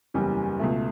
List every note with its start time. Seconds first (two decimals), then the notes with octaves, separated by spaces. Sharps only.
0.14 F#1 E2 C#3 G3 C#4
0.59 C#2 B2 A3